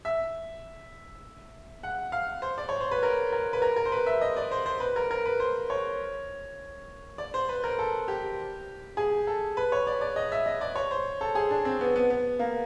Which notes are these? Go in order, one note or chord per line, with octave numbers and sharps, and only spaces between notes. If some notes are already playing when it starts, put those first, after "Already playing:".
E5
F#5
F5
C5
D5
C#5
C5
B4
A#4
A#4
B4
A#4
A#4
C5
B4
E5
D#5
D5
C5
C5
B4
A#4
A#4
B4
C5
C#5
D5
C5
B4
A#4
A4
G4
G#4
A4
B4
C#5
D5
D5
D#5
E5
D#5
D5
C#5
C5
A4
G#4
D4
C4
B3
B3
B3
A#3